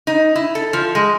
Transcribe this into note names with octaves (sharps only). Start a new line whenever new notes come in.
D#4
E4
A4
F3
G#3